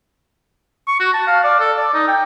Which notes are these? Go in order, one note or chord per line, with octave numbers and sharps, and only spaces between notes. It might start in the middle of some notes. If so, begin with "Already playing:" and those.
C#6
F#4
A5
F5
D5
A4
D5
D#4
G5